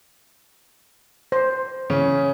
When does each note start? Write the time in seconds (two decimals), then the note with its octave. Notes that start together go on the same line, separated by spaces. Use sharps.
1.32 C5
1.90 C#3 E3 C#4